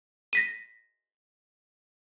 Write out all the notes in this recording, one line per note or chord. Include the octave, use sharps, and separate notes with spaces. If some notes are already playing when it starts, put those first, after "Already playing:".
A#6 B6 D#7